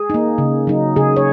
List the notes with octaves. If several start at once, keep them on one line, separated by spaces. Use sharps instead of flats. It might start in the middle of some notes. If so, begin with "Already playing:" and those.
Already playing: G#4
A#3 D#4
C#3
F#3 D#4
C#3 G#4
C#5